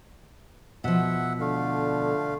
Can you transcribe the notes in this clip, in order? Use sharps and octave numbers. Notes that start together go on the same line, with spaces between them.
B2 F3 E5 F#5
D3 A3 F5